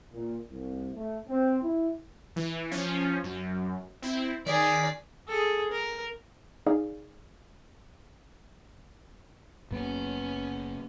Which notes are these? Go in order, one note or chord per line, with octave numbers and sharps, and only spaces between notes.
A#2
C2
A3
C4
E4
E3
F3 C#4 F4
F#2
C4 E4
D#3 G#4 D5 B6
G#4 A4
A#4
D#4 G#4 D5 F5
F#1 F#2 A#3 B3 C#4